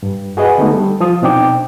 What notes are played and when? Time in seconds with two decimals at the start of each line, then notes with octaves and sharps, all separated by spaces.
0.03 G2
0.37 F#4 G#4 B4 D#5 F#5
0.58 D3 G#3 A3 B3 D#4
0.71 G3 A4
1.00 F3 F4 D#6
1.22 B2 C4 D4 D#4 G5 D6